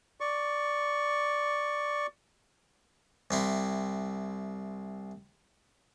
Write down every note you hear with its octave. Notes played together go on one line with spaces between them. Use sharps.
D5 C#6
C2 C4 E4